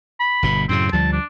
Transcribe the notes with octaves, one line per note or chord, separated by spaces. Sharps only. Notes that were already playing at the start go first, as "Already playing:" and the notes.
B5
G1 B2
F#2 A2 C#3 C4
D2 F3 G3 A5
D4